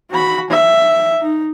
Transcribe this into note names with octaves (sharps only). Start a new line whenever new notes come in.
F#4 B5
E5
D#4